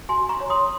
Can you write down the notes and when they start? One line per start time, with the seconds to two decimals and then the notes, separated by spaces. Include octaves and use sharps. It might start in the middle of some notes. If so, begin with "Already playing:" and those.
0.09 F#4 G#5 C6
0.29 A#5 C#6
0.40 C#5
0.50 C6 D#6